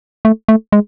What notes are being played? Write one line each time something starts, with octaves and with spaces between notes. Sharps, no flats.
A3
A3
G#3